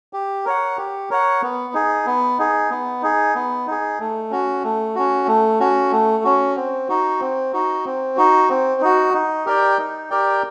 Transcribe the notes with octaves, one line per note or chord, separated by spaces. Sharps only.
G4
A#4 C#5 F#5
G4
A#4 C#5 F#5
B3
D#4 G#4
B3
D#4 G#4
B3
D#4 G#4
B3
D#4 G#4
A3
C#4 F#4
A3
C#4 F#4
A3
C#4 F#4
A3
C#4 F#4
C4
D#4 F#4
C4
D#4 F#4
C4
D#4 F#4
C4
D#4 F#4
D#4
G4 A#4 D5 G5
D#4
G4 A#4 D5 G5